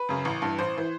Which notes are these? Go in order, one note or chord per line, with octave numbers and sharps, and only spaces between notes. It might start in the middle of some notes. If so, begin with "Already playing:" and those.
Already playing: B4
F#2 C#3
A1
G2 E3
A1 C5
E3